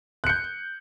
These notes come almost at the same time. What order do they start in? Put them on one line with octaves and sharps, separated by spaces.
F#6 C#7 G6